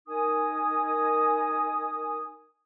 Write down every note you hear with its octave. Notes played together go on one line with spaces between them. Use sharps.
D#4 A#4 G#5 D#6